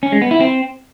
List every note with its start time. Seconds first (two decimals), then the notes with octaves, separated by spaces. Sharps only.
0.03 C#4
0.12 G#3
0.22 B3
0.31 E4
0.40 C4